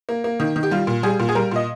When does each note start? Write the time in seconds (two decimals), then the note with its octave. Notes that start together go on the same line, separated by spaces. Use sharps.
0.09 A#3
0.24 A#3
0.40 D#3
0.56 D#3
0.63 G4
0.71 G3 F4
0.87 A#2
1.03 G3 G#4
1.19 A#2
1.29 G#4
1.35 G3 A#4
1.51 A#2 D#5